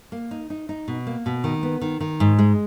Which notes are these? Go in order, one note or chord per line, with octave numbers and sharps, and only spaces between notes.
A#3
D#4
D#4
D#4
B2
A#3
B2
D#3
B3
D#3
D#3
G#2
G#3